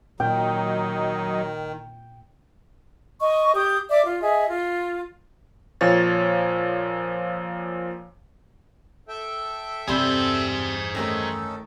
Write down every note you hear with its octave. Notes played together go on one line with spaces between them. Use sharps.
A#2 D#3 F#3 D#4 G5
D#5 C#6
G4 D#6 G6
D5 E5 D6
F4
G#4 D#5 E5
F4
A#2 F3 C#5 A6
A4 E5 G5
E2 G2 C3 G3 C4 G#4 C5
D#3 A3 C#4 D#4 A4 A#4